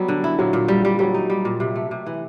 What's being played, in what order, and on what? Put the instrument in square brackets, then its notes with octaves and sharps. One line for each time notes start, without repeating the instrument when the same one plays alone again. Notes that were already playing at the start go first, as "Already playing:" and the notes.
Already playing: [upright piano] F#3 [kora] G3 B3
[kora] D3
E4
[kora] A#2 [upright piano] F#3
[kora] A#2
G3
G3
[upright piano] F#3 [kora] G3
[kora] D#4
G3
A#2
C3
A3
C3
E3